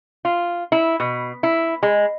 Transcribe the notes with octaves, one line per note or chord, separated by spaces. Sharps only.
F4
E4
B2
E4
G#3